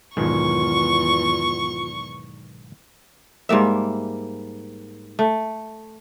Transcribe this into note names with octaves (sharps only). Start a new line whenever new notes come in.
B1 E2 G#2 D#3 F4 C#6
G#2 G3 A#3 E5
A3